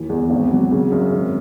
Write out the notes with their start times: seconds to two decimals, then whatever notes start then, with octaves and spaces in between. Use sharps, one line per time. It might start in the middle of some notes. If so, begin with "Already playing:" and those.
Already playing: D#2 E3
0.09 E2
0.30 G#1
0.51 F#3
0.71 C#3
0.92 F#2
1.12 G#1